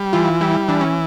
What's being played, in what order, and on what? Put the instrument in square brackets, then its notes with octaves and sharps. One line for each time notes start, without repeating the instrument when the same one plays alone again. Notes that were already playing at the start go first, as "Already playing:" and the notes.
Already playing: [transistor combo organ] G3
[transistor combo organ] E3 [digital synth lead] F4
[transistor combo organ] G3 [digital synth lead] E4
[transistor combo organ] E3 [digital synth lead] D4
[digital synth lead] C#4